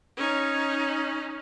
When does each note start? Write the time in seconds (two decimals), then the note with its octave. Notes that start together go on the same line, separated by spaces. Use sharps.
0.17 C#4 D#4